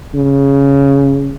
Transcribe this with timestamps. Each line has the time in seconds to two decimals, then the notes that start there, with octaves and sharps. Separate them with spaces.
0.14 C#3